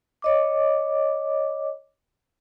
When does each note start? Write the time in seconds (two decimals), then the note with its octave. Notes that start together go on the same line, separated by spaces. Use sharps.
0.22 C#5 D#5 D6